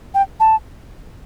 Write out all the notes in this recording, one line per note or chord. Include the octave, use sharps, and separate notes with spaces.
G5
A5